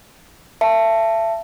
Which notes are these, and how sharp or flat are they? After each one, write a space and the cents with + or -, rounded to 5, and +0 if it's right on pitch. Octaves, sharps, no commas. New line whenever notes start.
E5 +30 A5 +0